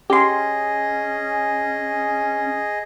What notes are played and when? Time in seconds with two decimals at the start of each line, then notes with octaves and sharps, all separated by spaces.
0.10 C#4 G4 G#4 D#5 C6